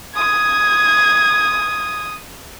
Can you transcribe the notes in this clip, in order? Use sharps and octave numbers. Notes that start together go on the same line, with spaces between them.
D#6 G#6